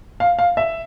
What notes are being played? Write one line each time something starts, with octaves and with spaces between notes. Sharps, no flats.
F5
F5
E5